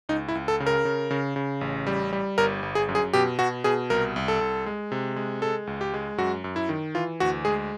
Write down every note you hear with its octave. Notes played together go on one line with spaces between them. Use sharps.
C#2 D#4
E4
C#2
A4
C#3
A#4
C#3
C#3
C#3
A1
G3
G3
G1 A#4
G1
G#4
F#2
G#4
B2 G4
B2 F#4
B2 G#4
C2 A#4
C2
A4
C2
G#3
C3
G#3
G#3 A4
C#2
G4
G#3
F#2 F#4
F#2
E4
D#3
E3 F4
D2 F#4
G#3 G#4